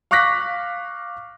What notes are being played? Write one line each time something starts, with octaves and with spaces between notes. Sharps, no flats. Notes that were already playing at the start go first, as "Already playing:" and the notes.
F5 C#6 D6 F#6 A#6 B6